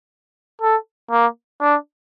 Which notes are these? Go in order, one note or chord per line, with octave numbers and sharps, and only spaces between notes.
A4
A#3
D4